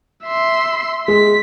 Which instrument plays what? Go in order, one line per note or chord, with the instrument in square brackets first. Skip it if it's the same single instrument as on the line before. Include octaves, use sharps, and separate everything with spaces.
[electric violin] E5 C6
[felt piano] G#3 [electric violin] B6